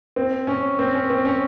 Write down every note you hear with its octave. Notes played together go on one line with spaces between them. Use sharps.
C4
C#4
C4
C#4
C4
C#4